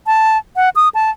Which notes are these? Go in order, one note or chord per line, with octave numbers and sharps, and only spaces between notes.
A5
F#5
D#6
A5